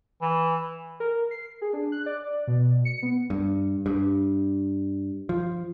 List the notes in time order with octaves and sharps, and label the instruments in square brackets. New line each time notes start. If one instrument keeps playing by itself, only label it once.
[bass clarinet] E3
[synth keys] A#4
C7
G#4
D4
F#6
D5
B2
C#7
B3
[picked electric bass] G2
G2
F3